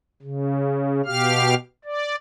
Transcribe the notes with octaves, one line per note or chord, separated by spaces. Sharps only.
C#3
B2 G4 F5 F6
D5